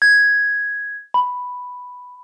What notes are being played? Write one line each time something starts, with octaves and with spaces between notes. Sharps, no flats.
G#6
B5